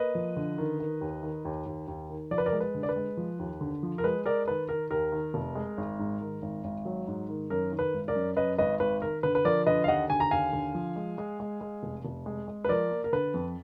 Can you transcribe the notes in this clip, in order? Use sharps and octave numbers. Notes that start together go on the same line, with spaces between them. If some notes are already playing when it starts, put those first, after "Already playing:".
Already playing: A#3 B4 D#5
F3
D3
D#3
D#3
D#2
D#3
D#2
D#2
D#2
D#3
F3 D5
B4
A#4 D5
G#3
B4
D3
D5
B4
G#3
F3
D#2
D3
F3
A#4
G#3 B4
G#3 A#4 D5
D#3 B4
D#3 A#4
D#2 A#4
D#3
F1
G#3
G#1
G#2
D#3
G#1
G#1
F#3
G#2
D#3
F#2 A#4
D#3
B4
G#1
A#4 D5
F#2
F#2 B4 D#5
G#1 B4 D#5
G#1 B4
D#3 A#4
D3 B4
B4
F3 A#4 D5
D3 B4 D#5
F5
D#2 D#5 F#5
D3 G#5
A#5
D#2 F5 G#5
D3
F3
G#3
G#3
G#3
G#3
F1
F1
G#3
G#3
B4
F3 A#4 D5
A#3
A#4
D3 B4
F2